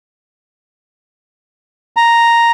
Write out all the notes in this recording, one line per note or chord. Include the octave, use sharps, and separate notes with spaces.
A#5